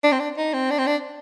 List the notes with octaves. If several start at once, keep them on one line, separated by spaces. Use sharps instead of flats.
D4
C4
D4
D#4
C4
D4
C4
D4